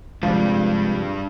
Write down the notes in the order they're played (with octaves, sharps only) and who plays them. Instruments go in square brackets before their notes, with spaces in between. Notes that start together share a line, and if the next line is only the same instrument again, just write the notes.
[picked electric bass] C3 F3 [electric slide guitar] G3 D4 B4 [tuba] G#3